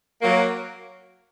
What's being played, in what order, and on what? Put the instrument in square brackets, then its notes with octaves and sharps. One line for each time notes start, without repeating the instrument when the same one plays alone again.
[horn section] F#3 A#3